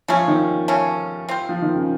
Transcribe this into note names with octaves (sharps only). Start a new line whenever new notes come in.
C#3 F3 A3 C#4
D#3
C#3 A3 C#4
C4 F4 C5
F3
D#3
C#3